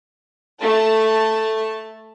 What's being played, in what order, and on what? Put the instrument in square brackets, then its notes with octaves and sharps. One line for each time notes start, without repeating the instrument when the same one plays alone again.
[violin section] A3 A5